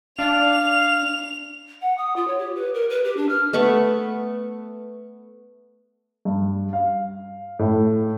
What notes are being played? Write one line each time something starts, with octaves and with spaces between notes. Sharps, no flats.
D4 F5 F7
F#5
D#6
F4
C#5
G4
B4
A#4
B4
G4
D4
F6
A3 B3 C#6
G2
F5
A2